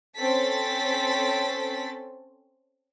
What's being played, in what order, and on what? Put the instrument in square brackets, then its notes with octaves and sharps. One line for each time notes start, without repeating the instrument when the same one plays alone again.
[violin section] C4 C#4 A4 A6 B6